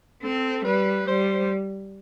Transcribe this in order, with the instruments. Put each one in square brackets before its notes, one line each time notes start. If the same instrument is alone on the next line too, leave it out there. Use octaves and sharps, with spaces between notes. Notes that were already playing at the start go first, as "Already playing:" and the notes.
[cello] C4 [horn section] A4
[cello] G3 [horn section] B4
[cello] G3 [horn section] C5